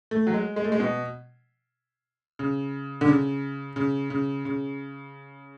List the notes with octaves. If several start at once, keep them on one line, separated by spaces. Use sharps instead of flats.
A3
F#3
G#3
G#3
A3
G#3
B2
C#3
D3
C#3
C#3
C#3
C#3